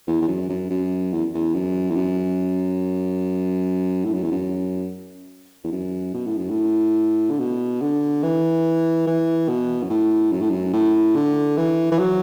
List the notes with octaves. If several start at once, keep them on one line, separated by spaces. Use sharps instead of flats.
E2
E2
F#2
F#2
F#2
E2
E2
F#2
E2
F#2
A2
F#2
E2
F#2
E2
F#2
B2
A2
F#2
A2
D3
B2
D3
E3
E3
B2
F#2
A2
F#2
A2
F#2
A2
D3
E3
E3
F#3